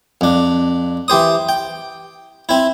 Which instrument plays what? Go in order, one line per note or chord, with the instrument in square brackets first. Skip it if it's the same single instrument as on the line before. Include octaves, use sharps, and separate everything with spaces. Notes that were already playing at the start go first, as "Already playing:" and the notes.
[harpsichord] F2 D4
E3 G4 C5 D#6
G5
C4 E4